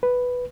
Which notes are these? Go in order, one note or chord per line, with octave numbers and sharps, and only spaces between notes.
B4